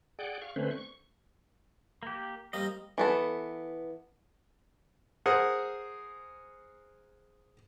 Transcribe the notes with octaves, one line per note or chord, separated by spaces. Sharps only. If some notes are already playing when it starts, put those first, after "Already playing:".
G#4 D5 F#5 G5
F5 C#6
D3 A3 C4 C#4 B4 C5
C#6
A#3 G4
G3 A#3 C4 D#5
E3 B3 A4
G#4 A#4 C5 F#5